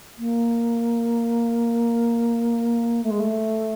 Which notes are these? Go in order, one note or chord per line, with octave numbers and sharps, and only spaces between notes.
A#3
A3
G#3
A3